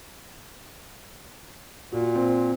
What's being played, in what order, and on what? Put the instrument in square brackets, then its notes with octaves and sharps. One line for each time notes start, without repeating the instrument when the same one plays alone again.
[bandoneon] A#2 [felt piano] F#4
[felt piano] C4